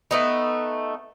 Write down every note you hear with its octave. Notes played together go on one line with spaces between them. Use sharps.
A3 B3 D#4